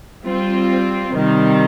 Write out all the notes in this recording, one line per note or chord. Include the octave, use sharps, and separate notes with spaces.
G3 C4 F4
C3 D#3 G3